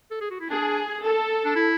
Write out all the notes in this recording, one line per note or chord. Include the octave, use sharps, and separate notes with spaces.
A4
G#4
F#4
E4
D4 G#4
A4
D4
E4